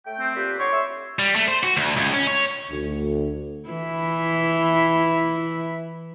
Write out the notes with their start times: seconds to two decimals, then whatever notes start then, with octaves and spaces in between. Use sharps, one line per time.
0.06 A3 G5
0.20 C4
0.36 A#2 G4 B4
0.59 D3 C#5 C6 D6
0.72 E4 C6 E6
1.19 G3
1.36 A3
1.48 C5
1.63 F#4
1.77 D2
1.96 C#2
2.13 C#4
2.27 C#5
2.71 D2
3.69 E3 E4